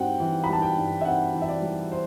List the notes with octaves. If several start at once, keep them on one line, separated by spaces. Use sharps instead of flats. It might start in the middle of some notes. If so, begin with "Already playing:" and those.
Already playing: G2 G3 C4 F#5 G5
E3
B5
G3 A5
G5
G2
E5
C4 F#5
E3
E5
D5
G3
C5